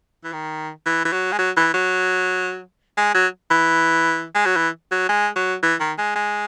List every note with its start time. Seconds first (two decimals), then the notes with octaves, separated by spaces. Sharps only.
0.24 E3
0.33 D#3
0.86 E3
1.05 E3
1.12 F#3
1.32 G#3
1.38 F#3
1.57 E3
1.74 F#3
2.97 G#3
3.15 F#3
3.51 E3
4.35 G#3
4.46 F#3
4.57 E3
4.92 F#3
5.09 G#3
5.36 F#3
5.63 E3
5.80 D#3
5.98 G#3
6.16 G#3